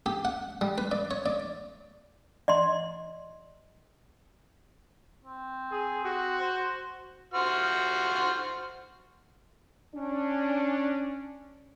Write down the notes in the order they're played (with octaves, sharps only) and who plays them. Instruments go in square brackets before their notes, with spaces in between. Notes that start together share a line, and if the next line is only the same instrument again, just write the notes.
[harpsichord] G4
F#5
G3
B4
D5
C#5
D5
[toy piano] D5 D#5 C6
[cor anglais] C4
[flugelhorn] G#4
F#4
[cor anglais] C5
[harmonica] F#4 C5 F6
[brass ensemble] C#4 D4